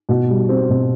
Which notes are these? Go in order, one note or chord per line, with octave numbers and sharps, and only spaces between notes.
B2
G3
C4
B2